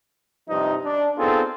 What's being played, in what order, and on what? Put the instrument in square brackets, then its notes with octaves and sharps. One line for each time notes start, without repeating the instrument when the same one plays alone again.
[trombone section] G2 C3 F3 D#4
D4
B3 C4 D#4 F4 G#4 A4